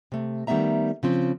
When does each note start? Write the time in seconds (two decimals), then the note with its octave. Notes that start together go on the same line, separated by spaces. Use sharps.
0.12 C3 A3
0.47 D#3 G3 A3 B3 E5 A#5
1.03 C#3 F3 C4